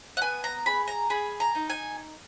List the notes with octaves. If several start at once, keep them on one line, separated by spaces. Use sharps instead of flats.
F#5
B3 G#5
A#5
G#4 B5
A#5
G#4 B5
A#5
D#4
G#5